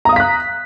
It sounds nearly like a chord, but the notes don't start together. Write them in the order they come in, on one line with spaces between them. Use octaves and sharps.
A#5 D#6 F5 B6 F#6